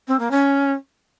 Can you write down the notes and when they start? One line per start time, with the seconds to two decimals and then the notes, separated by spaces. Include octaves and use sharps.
0.07 C4
0.19 A#3
0.31 C#4